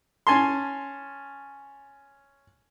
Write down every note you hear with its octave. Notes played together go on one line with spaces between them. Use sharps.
C#4 G#5 A5 C6